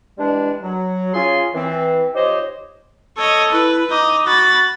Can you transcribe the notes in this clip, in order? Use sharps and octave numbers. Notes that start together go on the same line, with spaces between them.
E3 G3 G#3 D4
F#3
C#4 F4 G#4 F5 G#5 C6
E3 C4
F3 D#4 G4 C5 C#5 D#5
A4 C#5 D#5
E4 B4
D#4 D#5 D6
F#4 B5 A6